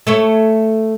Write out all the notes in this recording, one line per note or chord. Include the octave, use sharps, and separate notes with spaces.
A3 A4 C#5